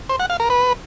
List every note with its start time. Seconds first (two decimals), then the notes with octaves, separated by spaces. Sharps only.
0.09 C5
0.20 F#5
0.30 F5
0.40 A#4
0.50 B4